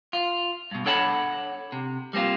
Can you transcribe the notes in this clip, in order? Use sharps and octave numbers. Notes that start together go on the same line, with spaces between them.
F4
G2 B2
D4 A4 C#5 F#5 A5 B5
C3
G3 A#3 C4 F4